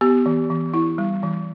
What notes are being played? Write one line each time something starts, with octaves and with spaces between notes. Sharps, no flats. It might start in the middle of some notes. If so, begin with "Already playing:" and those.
B3 G4
E3
E3
E4
G3
E3